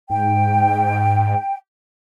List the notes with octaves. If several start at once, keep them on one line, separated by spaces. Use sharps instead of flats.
G#2 G5